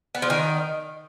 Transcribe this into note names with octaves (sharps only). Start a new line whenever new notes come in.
B3
F3
D#3